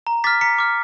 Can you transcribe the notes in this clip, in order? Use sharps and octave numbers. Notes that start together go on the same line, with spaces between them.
A#5
D6 F6 A6 B6
A#5 B6 C#7
D6 F6